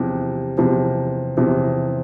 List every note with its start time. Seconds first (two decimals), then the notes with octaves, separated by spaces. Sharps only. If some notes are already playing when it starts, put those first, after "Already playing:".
Already playing: E2 C3 F3
0.58 E2 C3 F3
1.37 E2 C3 F3